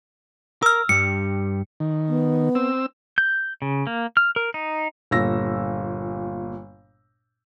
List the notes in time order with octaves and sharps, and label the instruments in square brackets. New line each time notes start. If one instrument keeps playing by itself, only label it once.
[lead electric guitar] A#4 [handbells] E6 F6
[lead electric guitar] G2 G3 [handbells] C#7
[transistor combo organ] D#3
[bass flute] B3
[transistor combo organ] C4 E6
[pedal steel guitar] G6
C#3
A#3
F6
A#4
D#4
[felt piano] G1 A#2 E6 A#6